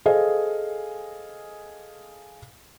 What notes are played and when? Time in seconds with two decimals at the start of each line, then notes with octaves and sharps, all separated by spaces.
0.06 G#4 A4 C5 D#5 F5 G#5